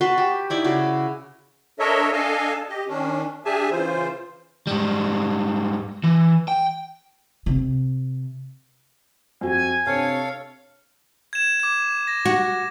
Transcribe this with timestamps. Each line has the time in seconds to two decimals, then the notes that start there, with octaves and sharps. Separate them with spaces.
0.01 F#4 B4 A5 C6
0.18 G4
0.50 D#4 E4 D5
0.64 C#3 F#4 D6
1.79 D4 A4 A#4 C#5 D#5 E5
2.13 D4 A4 D#5 F5 G#5 A5
2.69 G4 D#5
2.88 D#3 C#4 D4
3.45 D4 G4 G#4 E5 G#5 A5
3.71 C#3 E3 F4 C5
4.67 G#2 G3
6.04 E3
6.48 G5
7.46 C3
9.41 F2 F#4 G#5
9.86 C3 D4 A4 C#5 F5
11.33 G#6 E7
11.60 D6 G#6
12.07 A#6
12.26 F#4